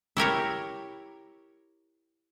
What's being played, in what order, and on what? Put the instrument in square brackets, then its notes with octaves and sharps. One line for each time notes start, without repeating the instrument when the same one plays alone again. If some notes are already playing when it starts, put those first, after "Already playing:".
[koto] E4 G4 A#4 C#5